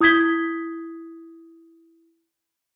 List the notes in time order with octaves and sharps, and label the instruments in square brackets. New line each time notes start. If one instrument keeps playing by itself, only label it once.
[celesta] E4 D#6 G6 G#6 B6 G7